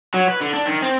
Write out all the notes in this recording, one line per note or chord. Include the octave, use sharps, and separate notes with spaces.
F#3
B4
D3
D4
D#3
C4